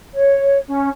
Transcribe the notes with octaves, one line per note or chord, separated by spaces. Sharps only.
C#5
C#4